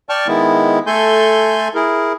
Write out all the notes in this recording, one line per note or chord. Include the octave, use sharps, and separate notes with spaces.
D5 G5 A5 C#6 F6
D#3 G#3 B3 E4
A3 A4 G#5 C6 G6
E4 G#4 A#4